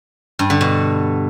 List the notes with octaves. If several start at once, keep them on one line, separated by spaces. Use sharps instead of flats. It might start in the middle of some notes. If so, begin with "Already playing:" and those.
G2
D3
B2